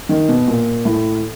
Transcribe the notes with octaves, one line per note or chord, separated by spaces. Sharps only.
D#3
B2
A#2
A2